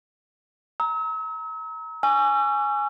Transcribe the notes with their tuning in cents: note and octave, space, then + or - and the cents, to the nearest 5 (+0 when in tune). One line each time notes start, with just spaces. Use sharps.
A#5 +0 E6 -45
G#5 +0 C#6 +20 E6 +45